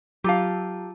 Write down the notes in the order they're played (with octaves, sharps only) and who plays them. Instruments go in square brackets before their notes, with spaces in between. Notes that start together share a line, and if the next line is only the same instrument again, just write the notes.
[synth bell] F#3 F4 A5 [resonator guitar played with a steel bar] G4 F5